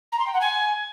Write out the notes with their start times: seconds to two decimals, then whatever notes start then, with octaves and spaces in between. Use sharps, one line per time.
0.12 A#5
0.19 C6
0.26 G5
0.33 F#5
0.41 G#5